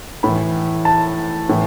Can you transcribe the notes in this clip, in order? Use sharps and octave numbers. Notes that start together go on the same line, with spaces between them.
A2 E3 B5
A5
A2 E3